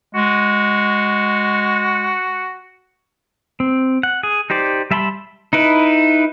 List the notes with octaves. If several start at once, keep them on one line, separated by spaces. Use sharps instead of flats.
G#3 F#4
C4
F#5
G#4
D#4 G4 C5 D5
G3 E5 A5 B5 C6
D#4 E4 B4